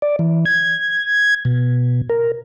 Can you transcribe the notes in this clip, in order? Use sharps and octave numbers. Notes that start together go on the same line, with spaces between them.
D5
E3
G#6
B2
A#4